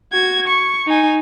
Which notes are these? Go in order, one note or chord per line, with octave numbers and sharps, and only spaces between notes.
F#4 G#6
C#6
D#4 G#5